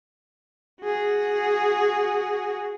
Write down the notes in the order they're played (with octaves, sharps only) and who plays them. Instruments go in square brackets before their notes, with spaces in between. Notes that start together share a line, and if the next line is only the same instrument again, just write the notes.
[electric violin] F#4 G#4